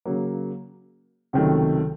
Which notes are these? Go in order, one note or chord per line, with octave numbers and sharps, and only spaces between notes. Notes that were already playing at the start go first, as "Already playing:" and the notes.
C#3 F#3 A#3
C#2 C3 D#3 F#3 A3